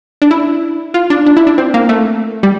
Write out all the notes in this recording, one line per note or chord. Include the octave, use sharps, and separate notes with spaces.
D4
E4
F4
D4
D4
E4
D4
C4
A#3
A3
G3